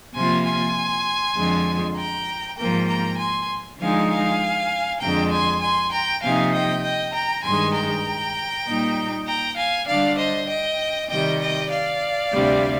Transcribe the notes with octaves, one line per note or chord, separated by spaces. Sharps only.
C3 F3 A#3 F4 G#5 C6
G#5 C6
F2 D3 F3 G#3
G5 A#5
G#2 F3 A#3 G5 A#5
G5 A#5
G#5 C6
D3 F3 G#3 D#4 F5 G#5
F5 G#5
F2 D3 G#3 G5 A#5
G#5 C6
G#5 C6
G5 A#5
C3 F3 A#3 D#4 F5 G#5
D#5 G5
D#5 G5
G5 A#5
G2 D#3 G#3 G#5 C6
G5 A#5
A#2 G3 A#3 D#4
G5 A#5
F5 G#5
D3 G3 D4 D5 F5
C5 D#5
D#5 G5
C3 D#3 G3 D#5 G5
D#5 G5
D5 F5
D2 C3 G3